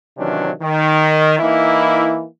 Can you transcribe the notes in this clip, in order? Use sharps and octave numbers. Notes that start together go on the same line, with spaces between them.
C3 D#3 E3 F#3 C#4 D4
D#3
E3 A#3 D#4 E4